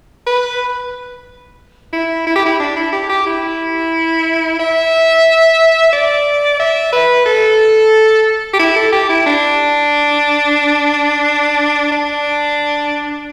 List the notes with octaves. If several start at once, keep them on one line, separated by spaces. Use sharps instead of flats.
B4
E4
E4
G4
E4
D4
E4
G4
G4
E4
E5
D5
E5
B4
A4
G4
E4
A4
G4
E4
D4
D4